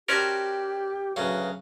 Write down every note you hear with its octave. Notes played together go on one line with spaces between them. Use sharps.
C#4 F#4 G4 A#4 C5 D5 A5
D2 C#3 F#3 B4